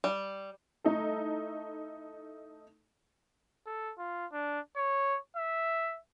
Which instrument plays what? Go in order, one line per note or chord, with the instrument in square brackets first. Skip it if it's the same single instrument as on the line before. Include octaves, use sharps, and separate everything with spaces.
[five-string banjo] G3
[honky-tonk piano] A3 D#4 E4 A4
[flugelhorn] A4
F4
D4
C#5
E5